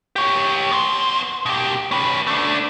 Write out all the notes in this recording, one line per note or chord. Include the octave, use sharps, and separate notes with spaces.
G4 C#5
B3 C6
B2 G4
C#4 B4
A3 D4